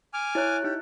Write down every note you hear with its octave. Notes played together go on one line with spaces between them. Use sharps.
G#5 D6 F6
E4 C#5 F#6
D#4 E4 G4